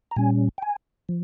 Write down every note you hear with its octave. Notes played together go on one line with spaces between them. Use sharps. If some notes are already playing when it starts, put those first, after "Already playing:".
A#5
A#2 G3 C#4 G#5
G5
G#5
F3